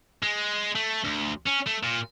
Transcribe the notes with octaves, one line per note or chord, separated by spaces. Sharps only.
G#3
A3
D2
C#4
A3
A#2